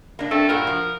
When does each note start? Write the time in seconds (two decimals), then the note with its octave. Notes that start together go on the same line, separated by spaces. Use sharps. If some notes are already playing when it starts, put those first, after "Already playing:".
0.19 A#3 D4
0.31 A3 C4
0.49 G2 A#2 F#4 A#4
0.67 F3